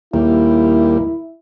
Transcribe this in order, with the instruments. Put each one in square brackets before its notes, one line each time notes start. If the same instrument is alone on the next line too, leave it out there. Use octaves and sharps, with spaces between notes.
[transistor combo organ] D#2 G3 A#3 [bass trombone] E4